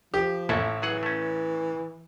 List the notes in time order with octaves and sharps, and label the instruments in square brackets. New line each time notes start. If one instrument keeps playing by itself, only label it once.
[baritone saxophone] F3 [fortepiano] G4
[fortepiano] A1 [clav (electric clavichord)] E4 A4
[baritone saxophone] E3 [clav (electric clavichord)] F#3 G#4 F#5
[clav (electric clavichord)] A3 C#4